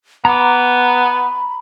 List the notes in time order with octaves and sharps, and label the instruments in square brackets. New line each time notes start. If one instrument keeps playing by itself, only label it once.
[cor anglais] B3 [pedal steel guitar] A#5 D6 [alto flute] B5